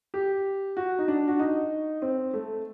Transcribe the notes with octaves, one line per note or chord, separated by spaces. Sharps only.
G4
F#4
D#4
D4
F#4
D#4
C4
A3